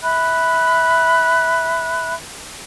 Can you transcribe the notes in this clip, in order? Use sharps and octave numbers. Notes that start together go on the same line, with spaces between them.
E5 B5 F#6